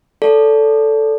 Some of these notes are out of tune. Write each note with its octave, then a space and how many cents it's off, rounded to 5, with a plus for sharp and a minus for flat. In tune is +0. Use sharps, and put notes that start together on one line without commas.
A4 +0 D5 -35